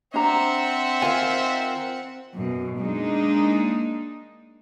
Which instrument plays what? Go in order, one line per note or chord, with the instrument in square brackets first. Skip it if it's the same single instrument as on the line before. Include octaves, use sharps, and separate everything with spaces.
[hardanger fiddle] C4 F#5 [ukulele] D4 A#5 [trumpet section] C5 E5
[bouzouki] D#3 F4 [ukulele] G#5
[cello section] F#2 B2
G#3 A#3 D4 D#4